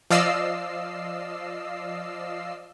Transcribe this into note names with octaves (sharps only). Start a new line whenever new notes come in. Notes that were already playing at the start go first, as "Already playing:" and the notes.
F3 D5 D#5 F5 E6 C7